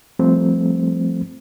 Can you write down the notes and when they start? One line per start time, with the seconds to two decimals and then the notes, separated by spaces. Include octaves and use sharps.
0.19 F3 G3 A3 C4